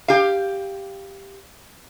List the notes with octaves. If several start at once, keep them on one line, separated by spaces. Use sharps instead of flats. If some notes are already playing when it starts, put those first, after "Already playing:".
G4 F5